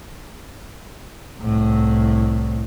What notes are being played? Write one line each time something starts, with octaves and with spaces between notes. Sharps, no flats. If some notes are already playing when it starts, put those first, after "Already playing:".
C2 A2